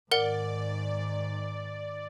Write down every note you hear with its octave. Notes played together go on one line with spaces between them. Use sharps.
G#2 D#3 A#4 D5 F#5 G7